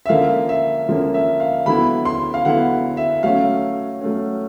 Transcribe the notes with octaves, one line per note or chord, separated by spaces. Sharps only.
E5
D3 F3 A#3 C#4 F5
E5
D3 F3 A#3 C#4
E5
F5
D3 F#3 B3 E4 B5
C6
F5
D3 F#3 B3 E4 F#5
E5
F#3 A3 C#4 F5
F#3 A3 C#4